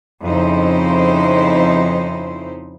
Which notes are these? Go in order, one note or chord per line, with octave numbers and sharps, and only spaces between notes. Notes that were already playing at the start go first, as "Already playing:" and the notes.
F2 C#3 F3 D#4 E4 C5